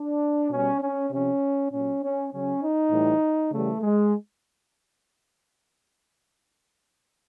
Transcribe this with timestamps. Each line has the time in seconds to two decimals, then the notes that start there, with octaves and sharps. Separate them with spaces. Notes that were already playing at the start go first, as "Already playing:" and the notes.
Already playing: D4
0.50 B2 G3 C#4
0.81 C#4
1.11 C3 F3 C#4
1.71 A#2 F#3 C#4
2.02 C#4
2.31 C#3 F#3 C#4
2.61 D#4
2.91 A2 E3 G3
3.52 C#3 E3 G3 A3
3.82 G#3